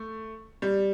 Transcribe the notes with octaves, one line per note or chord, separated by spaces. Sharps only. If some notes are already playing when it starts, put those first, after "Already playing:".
Already playing: A3
G3